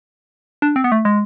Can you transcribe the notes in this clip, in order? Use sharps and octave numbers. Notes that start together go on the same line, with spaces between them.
D4
C4
B3
A3
G#3